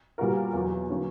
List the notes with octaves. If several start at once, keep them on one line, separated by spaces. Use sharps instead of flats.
A#2 G3 B3 F#4 A#4
E2 B2 F#3
D3 F#3 A#3 C#4